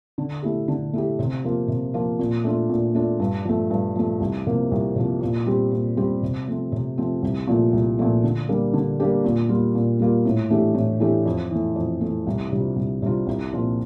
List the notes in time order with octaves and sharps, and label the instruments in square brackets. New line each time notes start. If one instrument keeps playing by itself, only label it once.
[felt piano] D3
A3 E4 G4
D3
A3 E4 G4
C3
F3 A#3 F4
C3
F3 A#3 F4
A#2
A3 D4 F4
A#2
A3 D4 F4
G2
F3 A3
G2
F3 A3
C2
C3 F3 A#3
C2
C3 F3 A#3
A#2
G3 C4 G4
A#2
G3 C4 G4
C3
F3 A3 C4
C3
F3 A3 C4
C2
A#2 F3 A3
C2
A#2 F3 A3
D3
G3 A#3 D4 G4
D3
G3 A#3 D4 G4
A#2
G3 A#3 F4
A#2
G3 A#3 F4
A2
E3 A3 D4 G4
A2
E3 A3 D4 G4
F2
E3 A3
F2
E3 A3
C2
C3 G3 D4 F4
C2
C3 G3 D4 F4
C2
A#2 F3 C4 F4